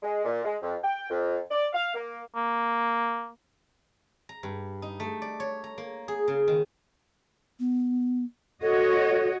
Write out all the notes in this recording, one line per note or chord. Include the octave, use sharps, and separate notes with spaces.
G#3
A#2
G#3
F2
G5
F2
D5
F5
A#3
A#3
A#5
G2
D#4
A3
D5
C#5
A#5
A#3
G#4
C#3
D#3
B3
F#4 A4 C#5 D#5